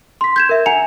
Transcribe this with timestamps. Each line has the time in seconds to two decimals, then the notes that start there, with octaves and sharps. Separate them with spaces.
0.21 C6 B6
0.36 G6 G#6 E7
0.49 A#4 E5
0.66 F#5 G#5 A#5 C#7 F7